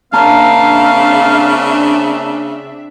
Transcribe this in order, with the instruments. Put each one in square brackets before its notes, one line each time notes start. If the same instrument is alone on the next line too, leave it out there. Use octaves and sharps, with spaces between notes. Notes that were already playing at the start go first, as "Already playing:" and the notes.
[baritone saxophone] C#3 [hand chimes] A#3 A5 A#5 [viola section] C4 D4 E5 [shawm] F5